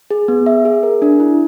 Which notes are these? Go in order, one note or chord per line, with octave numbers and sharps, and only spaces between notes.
G#4
B3
E5
G#4
A#4
D4
E4